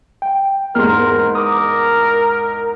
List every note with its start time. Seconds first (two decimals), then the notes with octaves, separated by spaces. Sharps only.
0.22 G5
0.75 E2 G#2 A#4 C6 F6
1.35 A#4 D6 D#6